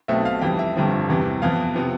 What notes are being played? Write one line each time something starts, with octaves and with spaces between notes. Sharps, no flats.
B1 B2 A3 C4 E5
F5
F2 E3 G3 G5
E5
G1 G2 D3 F3 C4
E2 C3 E3 G3
F2 E3 B3 F5
C3 F3 B3